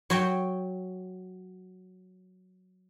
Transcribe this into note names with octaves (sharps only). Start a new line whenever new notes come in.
F#3 C#5 G5